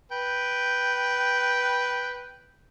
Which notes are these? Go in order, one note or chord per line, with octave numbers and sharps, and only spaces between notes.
B4 G5